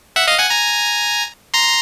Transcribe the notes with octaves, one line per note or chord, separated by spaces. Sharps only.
E5 F#5
D#5 F5
F#5 G#5
G#5 A#5
A#5 C6